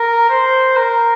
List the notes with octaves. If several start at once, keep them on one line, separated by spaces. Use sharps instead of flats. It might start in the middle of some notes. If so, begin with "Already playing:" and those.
Already playing: A#4
C5
A#4